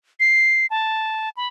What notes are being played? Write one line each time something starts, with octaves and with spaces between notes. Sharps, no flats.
C7
A5
B5